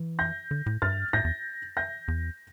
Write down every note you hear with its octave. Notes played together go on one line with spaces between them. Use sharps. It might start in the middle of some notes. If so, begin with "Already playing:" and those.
Already playing: E3
G6 A#6
D3
A2
G2 F6 A6
A2 G6 A#6
E2
G6 A#6
E2